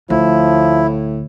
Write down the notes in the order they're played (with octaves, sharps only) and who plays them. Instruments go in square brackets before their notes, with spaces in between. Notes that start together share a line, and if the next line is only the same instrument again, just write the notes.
[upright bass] D2 [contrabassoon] A2 [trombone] F3 [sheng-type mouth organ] E4